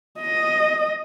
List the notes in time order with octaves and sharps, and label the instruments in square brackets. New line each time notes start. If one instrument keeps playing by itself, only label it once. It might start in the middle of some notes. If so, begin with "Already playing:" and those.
[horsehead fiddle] D#5